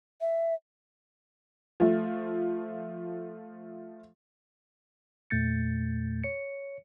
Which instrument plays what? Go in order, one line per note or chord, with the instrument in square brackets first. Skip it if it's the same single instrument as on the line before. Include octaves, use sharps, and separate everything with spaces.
[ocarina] E5
[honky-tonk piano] F3 A3
[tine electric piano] E2 A#2 A3 G6 A6 C#7
C#5 C#7